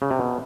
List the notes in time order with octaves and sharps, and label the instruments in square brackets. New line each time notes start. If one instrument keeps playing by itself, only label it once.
[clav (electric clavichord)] C#3
C3
B2